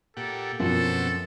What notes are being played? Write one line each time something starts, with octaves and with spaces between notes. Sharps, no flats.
A#2 G4 A4 F#5
F#2 B2 F3 C4 F#4 A4